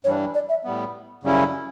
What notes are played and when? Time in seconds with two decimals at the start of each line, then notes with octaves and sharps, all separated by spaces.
0.04 G2 E3 G3 D4 C#5
0.34 D5
0.49 E5
0.64 A2 G3 B3
1.23 F#2 C#3 G3 C#4 E4